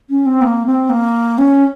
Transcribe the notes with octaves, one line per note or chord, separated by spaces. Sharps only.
C#4
C4
A#3
C4
A#3
C#4